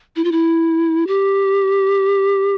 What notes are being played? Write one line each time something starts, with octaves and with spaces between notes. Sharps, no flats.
E4
F4
E4
G4